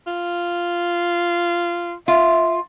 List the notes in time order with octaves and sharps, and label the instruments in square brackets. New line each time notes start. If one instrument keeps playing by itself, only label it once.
[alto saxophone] F4
[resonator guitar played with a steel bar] F4 [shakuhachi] E5